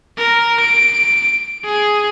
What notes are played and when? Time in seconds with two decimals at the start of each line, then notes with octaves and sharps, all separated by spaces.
0.18 A#4
0.60 D7
1.64 G#4